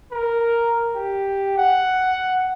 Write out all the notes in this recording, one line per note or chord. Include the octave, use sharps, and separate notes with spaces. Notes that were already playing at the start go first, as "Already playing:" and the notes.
A#4
G4
F#5